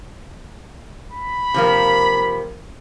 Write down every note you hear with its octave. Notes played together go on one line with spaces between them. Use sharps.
B5
C3 F3 A#3